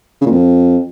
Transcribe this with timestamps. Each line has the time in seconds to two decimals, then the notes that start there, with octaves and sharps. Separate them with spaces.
0.21 C#3
0.26 A#2
0.31 F2